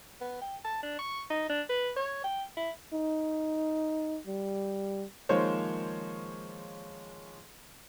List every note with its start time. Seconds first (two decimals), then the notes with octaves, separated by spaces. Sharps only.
0.21 B3
0.42 G5
0.64 A5
0.83 D4
0.99 C#6
1.30 D#4
1.49 D4
1.69 B4
1.96 C#5
2.24 G5
2.57 E4
2.93 D#4
4.27 G3
5.29 D#3 F3 G#3 A#3 C5 C#5